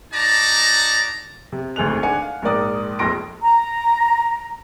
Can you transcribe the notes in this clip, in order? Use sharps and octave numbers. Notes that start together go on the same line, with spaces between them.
D#4 F#4 D5 A5 A#5
C3
G#1 D2 G#4 F#6 F7
D4 F#5 G#5 C#7
F5
A#1 G#2 A#4 D5 D#6
F1 A#1 F2 C6 A#6 D7
A#5